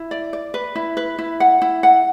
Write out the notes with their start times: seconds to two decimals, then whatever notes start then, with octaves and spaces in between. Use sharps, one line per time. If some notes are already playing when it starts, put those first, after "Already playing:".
Already playing: E4
0.11 D5
0.33 D5
0.54 B4
0.75 E4
0.97 B4
1.19 E4
1.40 F#5
1.62 E4
1.83 F#5